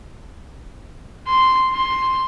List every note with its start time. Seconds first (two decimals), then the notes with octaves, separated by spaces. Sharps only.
1.28 C6
1.73 C6